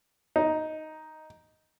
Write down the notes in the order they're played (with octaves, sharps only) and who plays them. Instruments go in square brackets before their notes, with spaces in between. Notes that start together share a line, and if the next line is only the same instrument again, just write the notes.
[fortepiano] D#4